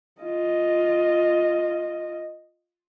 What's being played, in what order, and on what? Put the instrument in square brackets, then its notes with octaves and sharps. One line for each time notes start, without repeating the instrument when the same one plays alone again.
[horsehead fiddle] F4 D#5